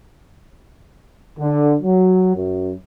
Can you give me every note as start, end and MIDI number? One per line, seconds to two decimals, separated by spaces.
1.39 1.74 50
1.82 2.33 54
2.36 2.72 42